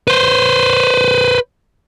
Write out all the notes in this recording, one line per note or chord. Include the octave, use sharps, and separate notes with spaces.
B4 C5